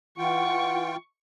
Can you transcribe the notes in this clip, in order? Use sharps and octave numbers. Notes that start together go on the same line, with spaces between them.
E3 F4 F#5 G5 C#6